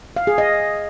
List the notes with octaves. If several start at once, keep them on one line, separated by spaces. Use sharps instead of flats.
F5
G#4
D#5